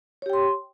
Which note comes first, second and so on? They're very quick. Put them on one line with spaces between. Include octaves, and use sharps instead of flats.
C#5 G4 G5 C6